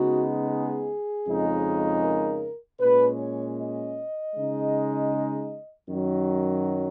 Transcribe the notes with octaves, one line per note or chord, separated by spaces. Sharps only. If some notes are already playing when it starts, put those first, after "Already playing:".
Already playing: C#3 G#3 B3 D#4 F#4
G#4
F2 C#3 G#3 D#4
A#4
A#2 G#3 C#4 B4
C#5
D#5
C#3 G#3 D#4
F#2 D#3 F#3